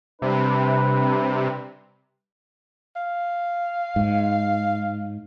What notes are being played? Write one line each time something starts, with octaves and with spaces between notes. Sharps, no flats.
C3 G3 D4 B4
F5
G#2